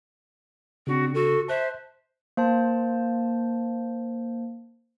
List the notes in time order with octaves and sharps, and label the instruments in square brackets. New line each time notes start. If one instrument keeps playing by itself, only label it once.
[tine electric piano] C#3 D4 [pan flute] C4 [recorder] F#4
[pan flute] F#4 [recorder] A4
[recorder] C5 [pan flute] E5 [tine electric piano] A5 F#6
[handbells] A#3 C5 A5